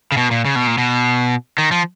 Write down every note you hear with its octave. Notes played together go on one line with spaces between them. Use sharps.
C#3
B2
A#2
C#3
B2
A#2
B2
D#3
F3